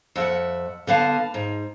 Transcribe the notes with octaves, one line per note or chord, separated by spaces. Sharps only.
F2 E5 F#5
D3 B3 F5 A5
G#2